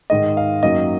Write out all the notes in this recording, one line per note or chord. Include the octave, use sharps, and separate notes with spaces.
G#2 D#3 G#3 D#5
F5
F#2 D#3 F#3 A#3 D#5